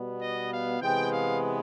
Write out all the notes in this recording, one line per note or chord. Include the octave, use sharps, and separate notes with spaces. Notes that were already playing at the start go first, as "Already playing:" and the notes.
Already playing: B2 G3 B3
D#5
F5
C3 E3 G#3 B3 G5
F5